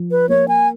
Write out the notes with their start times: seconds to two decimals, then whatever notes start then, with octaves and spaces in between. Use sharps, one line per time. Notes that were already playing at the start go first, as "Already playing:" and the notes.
Already playing: F3
0.11 B4
0.29 A#3 C#5
0.48 G#5